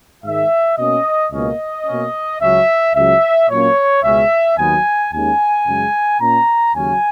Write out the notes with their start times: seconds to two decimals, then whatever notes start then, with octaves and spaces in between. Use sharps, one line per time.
0.24 G#2 D#3 G#3 E5
0.78 B2 A#3 C#4 D#5
1.32 C#2 B2 A#3 C#4 D#5
1.87 B2 A#3 C#4
2.41 C#2 C#3 F#3 C#4 E5
2.96 C#2 C#3 F#3 E5
3.50 A#2 F#3 A#3 C#4 C#5
4.03 C#2 B2 G#3 C#4 E5
4.57 D#2 D#3 F#3 B3 G#5
5.12 D#2 D#3 G#3 C#4 G#5
5.66 F#2 C#3 G#3
6.21 A#2 A#3 C#4 A#5
6.75 D#2 C#3 F#3 C#4 G#5